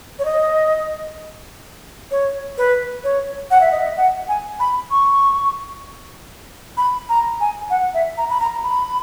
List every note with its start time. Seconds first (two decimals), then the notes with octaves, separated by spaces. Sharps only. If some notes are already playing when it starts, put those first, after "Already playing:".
0.19 C#5
0.25 D#5
2.11 C#5
2.58 B4
3.04 C#5
3.51 F#5
3.61 E5
3.71 D#5
3.81 E5
3.97 F#5
4.28 G#5
4.60 B5
4.91 C#6
6.77 B5
7.09 A#5
7.40 G#5
7.70 F#5
7.94 E5
8.18 A#5
8.30 B5
8.41 A#5
8.64 B5